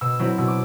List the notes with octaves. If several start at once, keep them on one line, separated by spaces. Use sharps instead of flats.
B2 E6
F#3 C4 E4
B2 E6
D6